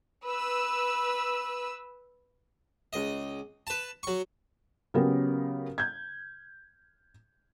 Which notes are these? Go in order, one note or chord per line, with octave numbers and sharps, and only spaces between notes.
B4 E6
C#2 D#5
B4 A5
F#3 C#6
C#3 F#3 B3 C#4 G4 A#4
G6 G#6